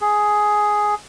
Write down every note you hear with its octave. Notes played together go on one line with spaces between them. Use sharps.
G#4